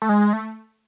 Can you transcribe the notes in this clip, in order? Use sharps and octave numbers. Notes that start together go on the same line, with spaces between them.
A3
G#3
A3